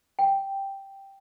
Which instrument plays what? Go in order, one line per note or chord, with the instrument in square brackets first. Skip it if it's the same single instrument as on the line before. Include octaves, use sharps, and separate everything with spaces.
[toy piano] G5